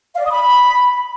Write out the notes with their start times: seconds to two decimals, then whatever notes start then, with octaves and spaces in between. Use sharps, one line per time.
0.15 F5
0.20 D5
0.25 D#6
0.30 B5